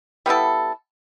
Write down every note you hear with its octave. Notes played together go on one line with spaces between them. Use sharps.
G3 B3 E4 A4